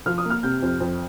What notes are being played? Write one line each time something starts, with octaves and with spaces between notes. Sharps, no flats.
F3 F6
D#6
A#3
F6
C3 G6
F2
F2